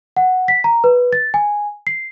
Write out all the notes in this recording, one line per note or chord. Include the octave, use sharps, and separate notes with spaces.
F#5
B6
A#5
B4
A6
G#5
C7